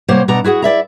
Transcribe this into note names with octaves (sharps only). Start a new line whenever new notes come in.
C3 G3 A#3 C5 C#5 F#5
B2 D4 F#5 A#5
E4 F#4 G#4 F#5
E4 D5 E5 A#5